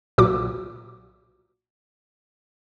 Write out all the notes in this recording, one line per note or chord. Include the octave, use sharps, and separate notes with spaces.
B1 A#2 F#4 D6